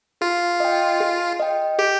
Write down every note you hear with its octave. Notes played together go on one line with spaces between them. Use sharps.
F4 G#4
D#5 G5
G#4
D#5 G5
G4 G#4